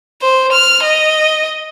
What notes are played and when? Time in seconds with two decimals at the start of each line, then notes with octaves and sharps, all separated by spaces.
0.22 C5
0.52 F6
0.83 D#5